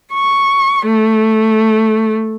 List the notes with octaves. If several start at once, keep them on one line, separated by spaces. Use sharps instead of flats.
C#6
A3